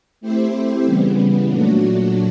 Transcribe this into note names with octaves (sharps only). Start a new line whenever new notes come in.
A3 C4 E4 G4 C5
C#3 E3 G3 B3
A#2 F#3 A3 D4 F#4